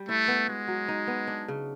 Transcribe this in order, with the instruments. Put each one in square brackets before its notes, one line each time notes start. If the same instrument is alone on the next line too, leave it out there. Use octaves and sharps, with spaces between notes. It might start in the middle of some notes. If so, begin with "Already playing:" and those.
Already playing: [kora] G3
[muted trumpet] A3 [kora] E4
[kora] B3
[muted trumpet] G#3 [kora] F#4
[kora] F#3
D#4
B3
D4
C#3